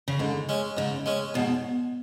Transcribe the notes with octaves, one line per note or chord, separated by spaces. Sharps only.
C#3
G#2 D3
G#3 C#4
G#2 C#3
G#3 C#4
G#2 B2